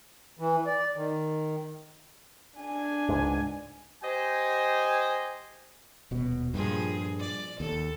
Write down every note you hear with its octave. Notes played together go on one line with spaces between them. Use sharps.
E3
D5
D#3
D4 G#5
C#2 G#2
G4 C5 D#5 G#5
D#1 B2
G2 A#2 F3 G#4
D5
D#2 A4